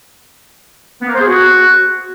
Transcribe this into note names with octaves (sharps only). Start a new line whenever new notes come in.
B3
A#3
C5
G#4
F#4